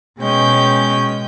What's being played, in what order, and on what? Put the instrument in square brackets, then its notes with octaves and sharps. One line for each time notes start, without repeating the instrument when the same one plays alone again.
[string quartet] B2 G#3 C#4 G5 G6